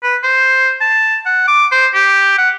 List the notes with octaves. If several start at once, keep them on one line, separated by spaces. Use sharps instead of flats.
B4
C5
A5
F#5
D6
C5
G4
F#5